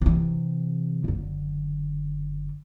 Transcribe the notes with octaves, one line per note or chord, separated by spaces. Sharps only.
C3 E3
F#1 D3